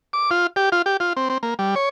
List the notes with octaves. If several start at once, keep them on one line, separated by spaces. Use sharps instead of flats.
D6
F4
G4
F4
G4
F4
C4
C4
A#3
G3
C#5